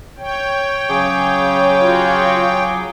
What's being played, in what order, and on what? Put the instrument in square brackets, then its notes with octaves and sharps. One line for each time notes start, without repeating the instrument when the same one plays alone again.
[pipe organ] C#5 G5
[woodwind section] C#3 [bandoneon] F#3 G#4 D6
[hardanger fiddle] F4 F#4